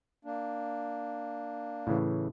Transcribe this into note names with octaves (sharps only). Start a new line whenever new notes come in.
A#3 D4
A2 C#3 E3